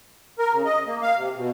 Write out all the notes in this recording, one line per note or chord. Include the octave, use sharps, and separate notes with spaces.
A#4
C#3
D#5
A#3
F5
C3
B2